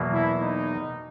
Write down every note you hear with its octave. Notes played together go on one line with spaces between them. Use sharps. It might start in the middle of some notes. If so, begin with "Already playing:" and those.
Already playing: E2 B2 F#3 A#3
E4
D#4